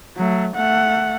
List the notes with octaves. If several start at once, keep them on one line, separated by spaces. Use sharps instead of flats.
F#3 A3
A3 F#5